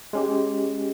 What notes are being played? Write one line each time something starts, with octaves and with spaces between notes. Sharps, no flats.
G#3 C#4 G4